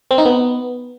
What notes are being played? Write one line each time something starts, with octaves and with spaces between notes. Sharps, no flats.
C4
D#4
B3